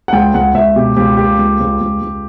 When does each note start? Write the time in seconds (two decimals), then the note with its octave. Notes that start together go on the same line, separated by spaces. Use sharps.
0.08 F#5
0.13 C#2 G5
0.34 C#2 F#5
0.54 C#2 E5
0.76 B2 G4
0.97 C#2 G4
1.17 A#3 G4
1.39 C#2
1.60 C#2
1.81 C#2
2.02 C#2